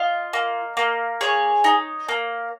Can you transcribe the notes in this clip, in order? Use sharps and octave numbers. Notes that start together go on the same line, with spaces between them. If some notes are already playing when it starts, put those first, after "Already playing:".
Already playing: F4 D#5
A#3
A#3
G#4 C#5
D#4
A#3